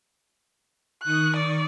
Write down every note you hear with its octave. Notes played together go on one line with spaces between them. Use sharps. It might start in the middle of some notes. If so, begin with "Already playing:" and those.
D#3 C#6 D#6 F#6
D5